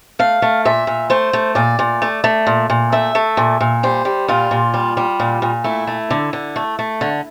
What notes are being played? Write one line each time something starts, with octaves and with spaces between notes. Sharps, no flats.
A3 F5
A3
A#2 E5
A#2
A3 C5
A3
A#2 D5
A#2
A3
A3
A#2
A#2
A3 E5
A3
A#2
A#2
G3 C5
G3
A#2 F4
A#2
G3
G3
A#2
A#2
A3 E4
A3
D3
D3
A3
A3
D3